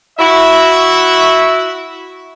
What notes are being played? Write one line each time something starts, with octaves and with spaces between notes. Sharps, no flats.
E4 F#4 E5